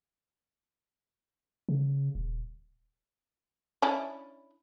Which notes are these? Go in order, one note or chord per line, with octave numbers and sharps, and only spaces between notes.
C#3
D#1
C#4 D4 E4